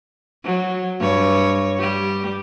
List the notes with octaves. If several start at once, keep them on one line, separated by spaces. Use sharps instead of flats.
F#3
G2 C#5
G3 G4